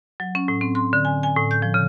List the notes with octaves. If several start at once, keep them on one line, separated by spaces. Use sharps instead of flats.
F#3
C#4
A2
C4
C6
D3
G#5
G#5
A2
G6
F3
C#3